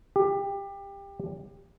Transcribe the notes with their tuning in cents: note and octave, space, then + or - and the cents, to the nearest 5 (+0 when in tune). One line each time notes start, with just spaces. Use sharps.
G4 +20